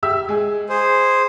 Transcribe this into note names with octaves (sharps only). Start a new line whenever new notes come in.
G4 E5 E6
G#3 G#5
G#4 C5